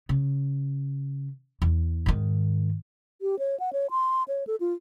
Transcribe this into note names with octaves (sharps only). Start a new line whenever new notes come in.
C#3
E2
G#2 D#3
G4
C#5
F#5
C#5
C6
C#5
A4
F4